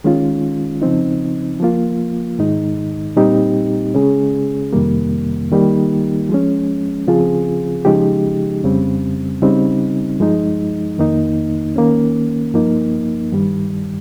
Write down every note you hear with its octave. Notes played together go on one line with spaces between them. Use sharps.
D#3 G#3 C#4 F4
C#3 F3 C4 D#4
F3 A#3 F4
G#2 D#3 G#3 D#4
A#2 G3 C4 D#4 G4
C#3 G#3 C#4 G#4
F2 C3 D#3 G3 A#3
D#3 G3 A#3 D#4 G4
F3 G#3 C#4
C#3 F3 C4 F4 G#4
C#3 F3 G#3 D#4 G4
F2 C#3 G3 C4
C#3 G3 C4 D#4
G2 F3 G#3 D#4
F2 D#3 A#3 D#4
D#3 A#3 C#4
G2 F3 A#3 D#4
G2 D#3 G3